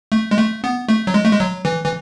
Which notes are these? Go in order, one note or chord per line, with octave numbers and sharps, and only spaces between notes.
A3
G#3
A3
B3
A3
F#3
G#3
A3
G#3
F#3
E3
E3